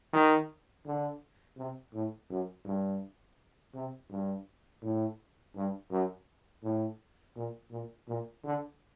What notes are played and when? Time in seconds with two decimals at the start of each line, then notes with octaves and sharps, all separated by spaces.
0.13 D#3
0.85 D3
1.57 C3
1.93 A2
2.30 F#2
2.65 G2
3.74 C3
4.10 G2
4.82 A2
5.55 G2
5.91 F#2
6.63 A2
7.36 A#2
7.71 A#2
8.08 A#2
8.44 D3